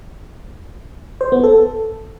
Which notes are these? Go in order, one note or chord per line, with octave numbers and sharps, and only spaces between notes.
C5
B3
A4